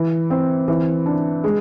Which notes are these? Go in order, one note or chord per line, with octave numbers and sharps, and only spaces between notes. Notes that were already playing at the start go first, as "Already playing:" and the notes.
Already playing: E3
C4
E3
D4
G#3